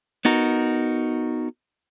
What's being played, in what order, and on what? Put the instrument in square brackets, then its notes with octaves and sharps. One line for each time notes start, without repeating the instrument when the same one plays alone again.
[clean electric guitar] B3 D#4 F#4 A#4